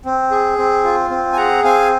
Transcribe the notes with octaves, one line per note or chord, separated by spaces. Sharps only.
C4
G#4
C4
F4
C4
G#5
G#4 F#5 A#5
C4 F5 G#5